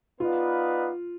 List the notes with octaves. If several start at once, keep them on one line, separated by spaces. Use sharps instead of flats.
B3 D#4 F4 B4 D5 F5